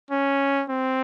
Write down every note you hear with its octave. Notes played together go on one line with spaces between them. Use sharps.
C#4
C4